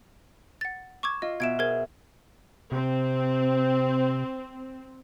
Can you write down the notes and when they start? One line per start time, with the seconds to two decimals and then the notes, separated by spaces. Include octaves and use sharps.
0.61 F#5 A6
1.03 C#6 D6 E6 G#6
1.22 F4 D#5
1.40 B2 E5 G#6 D7 E7
1.59 G#4 A#4 C5 G#6
2.72 C3 C4